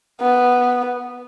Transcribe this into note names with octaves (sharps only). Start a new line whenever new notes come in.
B3